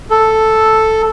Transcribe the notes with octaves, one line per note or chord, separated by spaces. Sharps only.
A4